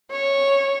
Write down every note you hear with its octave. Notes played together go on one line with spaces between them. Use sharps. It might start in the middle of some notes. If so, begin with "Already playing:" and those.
C#5